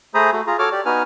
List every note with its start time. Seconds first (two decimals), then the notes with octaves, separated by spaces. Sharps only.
0.14 A3 G#4 C5 A#5 B5 D#6
0.33 A3 F#4
0.47 F4 G#4 A#5
0.59 F#4 A4 C#5 D6 F6
0.72 G4 D5
0.86 B3 D#4 F#4 B4 G#5 F6